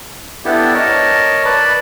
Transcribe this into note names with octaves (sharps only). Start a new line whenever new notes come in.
B3 D4 E4 G4 A4
A#4 C#5 D#5 A5
B4 D5 A5 B5